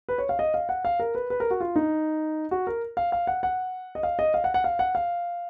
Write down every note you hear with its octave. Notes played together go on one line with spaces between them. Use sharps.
B4
C#5
F5
D#5
F5
F#5
F5
A#4
B4
B4
A#4
F#4
F4
D#4
F#4
A#4
F5
F5
F#5
F#5
D#5
F5
D#5
F5
F#5
F#5
F5
F#5
F5